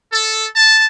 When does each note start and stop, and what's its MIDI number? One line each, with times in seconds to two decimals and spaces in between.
0.13 0.46 69
0.56 0.85 81